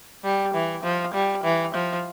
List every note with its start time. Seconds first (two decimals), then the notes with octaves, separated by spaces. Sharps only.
0.24 G3
0.54 E3
0.84 F3
1.14 G3
1.44 E3
1.74 F3